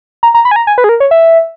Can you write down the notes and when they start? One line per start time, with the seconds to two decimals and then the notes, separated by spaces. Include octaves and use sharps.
0.23 A#5
0.34 A#5
0.45 B5
0.51 G#5
0.56 A#5
0.67 G#5
0.78 B4
0.84 G#4
0.89 A#4
1.00 C#5
1.11 E5